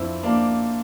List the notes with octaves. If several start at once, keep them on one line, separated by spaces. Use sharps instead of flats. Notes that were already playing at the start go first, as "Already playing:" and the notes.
Already playing: F2 C4 D4 E4 F4
A#3 D4